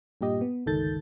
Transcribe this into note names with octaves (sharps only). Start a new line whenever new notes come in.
G2 A#2 G4 D#5
B3
G1 C#2 D#3 A4 G6 A6